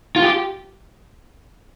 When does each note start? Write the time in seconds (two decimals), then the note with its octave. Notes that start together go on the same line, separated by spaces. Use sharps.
0.16 F4
0.22 G4